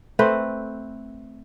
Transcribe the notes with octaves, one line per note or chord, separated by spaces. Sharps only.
A3 C4 B4 C5